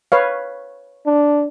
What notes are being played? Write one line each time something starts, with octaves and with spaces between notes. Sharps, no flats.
B4 C#5 F5
D4